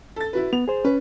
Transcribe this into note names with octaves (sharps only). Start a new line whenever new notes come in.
A4 A6
E4 F#4 B4
B3 F7
G#4 C5
C#4 B4